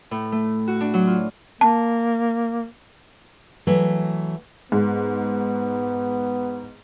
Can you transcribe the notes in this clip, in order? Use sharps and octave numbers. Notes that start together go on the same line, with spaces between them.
A2
A3
F#4
D4
F#3
F4
A#3 A5
E3 F#3 A3
G#2 B3